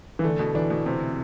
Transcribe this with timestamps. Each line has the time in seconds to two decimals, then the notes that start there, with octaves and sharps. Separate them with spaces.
0.19 E3
0.24 D3 A3
0.39 B2
0.55 E3 D4
0.70 B2
0.86 C3 C4